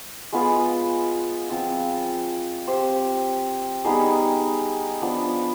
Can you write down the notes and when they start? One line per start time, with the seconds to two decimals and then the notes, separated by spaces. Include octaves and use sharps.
0.32 G#3 B3 F4 B4
1.50 F3 C4 F4
2.67 C4 G4 C5
3.85 G3 B3 D#4 G#4
5.02 F3 B3 D4